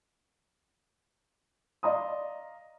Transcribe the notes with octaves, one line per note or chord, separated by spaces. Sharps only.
D5 D#5 F5 A#5 C6 D#6